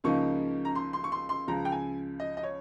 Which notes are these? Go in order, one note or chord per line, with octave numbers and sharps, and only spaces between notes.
C#2 C#3 F3 A#3 D#4 C#6
A#5
C6
C6
C#6
C6
C6
C#2 C#3 F3 A#5
G5
G#5
D#5
D#5
C#5